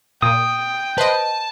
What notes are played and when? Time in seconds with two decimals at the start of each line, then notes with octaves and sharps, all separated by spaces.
0.22 A#2 G5 D#6
0.98 B4 C5 D#5 A5